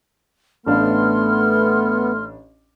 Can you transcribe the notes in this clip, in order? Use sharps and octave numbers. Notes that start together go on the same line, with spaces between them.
A1 A3 B3 D4 F5 C6 F6